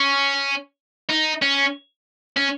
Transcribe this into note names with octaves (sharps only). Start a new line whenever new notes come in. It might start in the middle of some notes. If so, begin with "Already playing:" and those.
Already playing: C#4
D#4
C#4
C#4